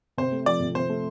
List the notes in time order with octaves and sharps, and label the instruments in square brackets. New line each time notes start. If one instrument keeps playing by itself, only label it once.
[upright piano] C3 [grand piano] C5
[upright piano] A3
[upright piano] F3 [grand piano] D5
[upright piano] C3
[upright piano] C3 [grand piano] C5
[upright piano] A3